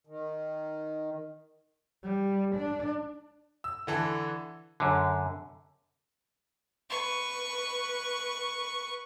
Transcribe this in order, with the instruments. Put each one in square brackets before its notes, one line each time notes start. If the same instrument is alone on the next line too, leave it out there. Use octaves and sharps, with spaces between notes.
[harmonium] D#3
[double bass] G3
D4
[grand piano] E6
D3 E3 A4
[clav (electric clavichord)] F#2 D3
[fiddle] B4 C#6